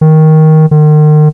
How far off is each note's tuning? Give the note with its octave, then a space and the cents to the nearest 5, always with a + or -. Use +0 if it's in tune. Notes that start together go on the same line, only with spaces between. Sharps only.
D#3 +10
D#3 -40